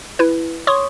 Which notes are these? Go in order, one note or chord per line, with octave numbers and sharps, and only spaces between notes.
E4 B4
C#5 C6 C#6 D#6